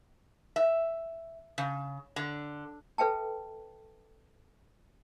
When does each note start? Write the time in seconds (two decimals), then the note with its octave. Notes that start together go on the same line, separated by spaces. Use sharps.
0.56 E5
1.58 C#3
2.16 D3
2.98 A4 B4 E5 G5 A5